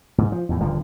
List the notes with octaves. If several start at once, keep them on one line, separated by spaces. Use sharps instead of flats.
G#2
F3
E2 A2
D#1 G2 D3 F3